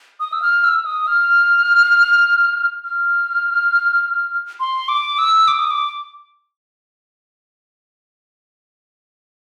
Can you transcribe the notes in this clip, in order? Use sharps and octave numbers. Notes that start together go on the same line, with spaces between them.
D#6
E6
F6
E6
D#6
F6
F6
C6
D6
E6
D6
D#6
D6